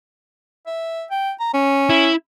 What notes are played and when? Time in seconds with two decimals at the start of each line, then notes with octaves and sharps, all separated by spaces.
0.67 E5
1.11 G5
1.40 A#5
1.54 C#4
1.89 E4